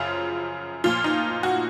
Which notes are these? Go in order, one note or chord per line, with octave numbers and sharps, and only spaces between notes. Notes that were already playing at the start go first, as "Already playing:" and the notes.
Already playing: F#2 C#3 F3 F4
A#2 F3 F4
D#4
F#4